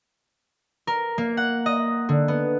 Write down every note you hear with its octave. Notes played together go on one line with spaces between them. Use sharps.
A#4
A#3
F#5
D#5
D3
B3